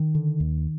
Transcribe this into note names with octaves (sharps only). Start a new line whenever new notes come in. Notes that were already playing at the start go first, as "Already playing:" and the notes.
Already playing: D#3
D3
D#2